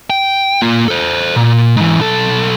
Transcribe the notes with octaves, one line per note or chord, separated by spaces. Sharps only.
G5
A#3 F4
A4 C5
A#2
G#2 E3
B1 A4